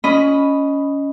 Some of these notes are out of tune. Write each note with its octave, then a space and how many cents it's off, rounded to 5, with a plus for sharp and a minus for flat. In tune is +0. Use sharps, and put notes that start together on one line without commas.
C#4 +15 D#5 +0 B5 +0